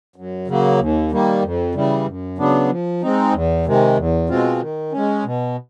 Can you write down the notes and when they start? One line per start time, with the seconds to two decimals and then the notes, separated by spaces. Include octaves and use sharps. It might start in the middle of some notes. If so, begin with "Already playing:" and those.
0.16 F#2
0.48 C#3 F#3 A#3
0.79 D#2
1.11 D#3 G3 A#3
1.43 F2
1.75 C#3 E3 G3
2.07 F#2
2.38 C#3 F#3 B3 D4
2.70 F3
3.02 G#3 C4 D#4
3.33 E2
3.66 C3 D#3 G#3
3.97 E2
4.29 B2 G#3 C4 F4
4.61 D#3
4.92 G#3 C#4
5.25 B2